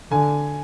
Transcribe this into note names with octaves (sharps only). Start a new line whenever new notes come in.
D3 G#5